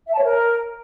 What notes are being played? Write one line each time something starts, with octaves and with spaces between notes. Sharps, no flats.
E5
A5
C#5
A#4